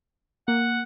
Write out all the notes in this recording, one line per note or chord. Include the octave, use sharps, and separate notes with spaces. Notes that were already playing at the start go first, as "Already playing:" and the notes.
A#3 F#5